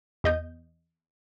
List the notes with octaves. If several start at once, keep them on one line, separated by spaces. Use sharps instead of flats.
E2 D#5 G6